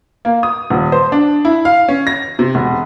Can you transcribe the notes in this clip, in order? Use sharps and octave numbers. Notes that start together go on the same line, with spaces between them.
A#3
D#6
D#1
C5
D4
E4
F5
C#4
A#6
C3
E1